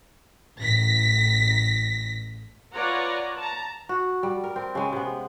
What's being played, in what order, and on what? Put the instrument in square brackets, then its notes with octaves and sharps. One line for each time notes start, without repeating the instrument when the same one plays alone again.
[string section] A1 A#6 B6
[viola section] F4 B4 C#5 D5 F#5 A#5
A5 A#5
[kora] F#4
G3
A#4
C4
C#3 G#3
C3 B3